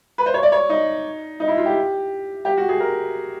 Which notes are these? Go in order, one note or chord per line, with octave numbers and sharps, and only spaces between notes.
B4
C5
C#5
D5
C#5
D#4
D#4
E4
F4
G4
G4
F#4
G#4
A#4